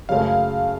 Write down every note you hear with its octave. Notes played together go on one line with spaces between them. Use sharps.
F#1 F#2 C#3 F#3 A3 F5